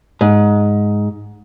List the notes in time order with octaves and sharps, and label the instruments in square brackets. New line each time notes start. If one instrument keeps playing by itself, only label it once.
[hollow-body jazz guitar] G#2